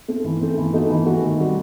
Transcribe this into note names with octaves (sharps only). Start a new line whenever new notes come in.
A3 C4
E3
A3 C4
E3
A3 D#4 F#4
E3
A3 D#4 F#4
D#3
G3 C4 F#4